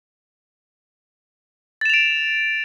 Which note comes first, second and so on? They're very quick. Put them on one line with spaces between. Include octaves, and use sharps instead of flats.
A6 E7 F7 D7